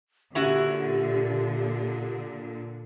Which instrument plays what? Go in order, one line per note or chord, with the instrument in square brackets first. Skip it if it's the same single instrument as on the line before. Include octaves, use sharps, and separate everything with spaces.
[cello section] A#2 D3 [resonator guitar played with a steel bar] C#4 E4 F#4 [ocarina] G4